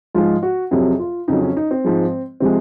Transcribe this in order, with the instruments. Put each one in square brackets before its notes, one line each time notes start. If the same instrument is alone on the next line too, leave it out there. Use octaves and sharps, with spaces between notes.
[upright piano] G#2 F3 G#3 F4
F#4
F2 C3 F#3 G#4
F4
F2 C#3 F#3 D#4
C#4
D#4
C4
G#2 F3 G#3
C3 F3 G#3 C4